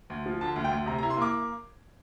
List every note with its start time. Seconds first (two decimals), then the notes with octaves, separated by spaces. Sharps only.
0.10 D2
0.26 F3
0.41 D3 A5
0.56 D2
0.64 G5
0.71 D2
0.86 C3 A#5
0.98 A#5
1.03 E4
1.10 C6
1.17 A#3 D6